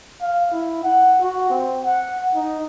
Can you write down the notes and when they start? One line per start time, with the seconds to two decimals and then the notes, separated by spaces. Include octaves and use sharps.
0.22 F5
0.52 E4
0.83 F#5
1.21 F#4
1.50 C4
1.84 F#5
2.35 D#4